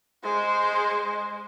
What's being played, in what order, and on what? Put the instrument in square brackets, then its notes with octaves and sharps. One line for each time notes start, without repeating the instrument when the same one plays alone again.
[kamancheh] G#3 C5